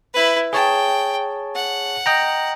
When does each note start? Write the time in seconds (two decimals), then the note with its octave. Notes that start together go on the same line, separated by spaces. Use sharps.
0.14 E4 B4
0.53 G#4 C#5 G5 A5
1.55 F#5
2.06 D#5 G5 A#5